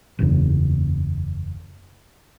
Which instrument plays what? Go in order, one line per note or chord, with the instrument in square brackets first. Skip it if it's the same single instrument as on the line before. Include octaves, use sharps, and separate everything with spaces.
[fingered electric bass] F#1 E2 C#3